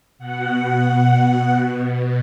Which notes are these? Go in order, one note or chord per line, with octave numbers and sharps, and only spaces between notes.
B2 F#5
B2